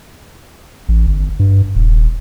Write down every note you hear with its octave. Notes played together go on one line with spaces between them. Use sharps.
A1
G1
G2
D#1